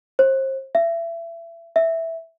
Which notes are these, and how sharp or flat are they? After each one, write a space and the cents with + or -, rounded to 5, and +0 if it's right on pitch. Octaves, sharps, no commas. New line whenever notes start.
C5 +35
E5 +30
E5 -5